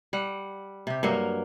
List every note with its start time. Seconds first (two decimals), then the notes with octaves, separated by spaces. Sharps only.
0.13 G3 F#5
0.87 C3 G4
1.03 G2 F#3 A#3 A#4